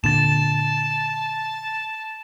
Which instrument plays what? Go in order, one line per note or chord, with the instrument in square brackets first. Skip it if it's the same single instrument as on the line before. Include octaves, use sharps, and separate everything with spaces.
[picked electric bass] A#2 D3 [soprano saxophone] A5 [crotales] A6 E7